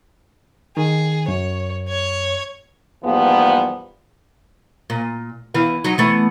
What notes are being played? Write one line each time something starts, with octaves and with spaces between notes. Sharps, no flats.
D#3 G#4
F#2 C#5
C#5 G#6
E2 G#2 F3 G3 A#3 B3
A#2
E2 E3 F5
F#3 D#4
E3 A3 B3